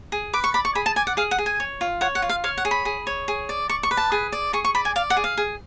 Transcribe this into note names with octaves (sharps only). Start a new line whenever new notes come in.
G#4
B4 D6
C#6
D5 B5
C#6
G#4 B5
A5
D5 G#5
F#5
G#4 F5
F#5
G#4
G#5
C#5
F4
C#5 F#5
F#5
F4
F5
C#5 F5
F#5
G#4
B5
G#4
C#5
G#4
D5
D5 C#6
C#6
B4
A5
G#4
D5
G#4 C#6
C#6
D5 B5
G#5
D5 F5
F#5
G#4
F5
G#4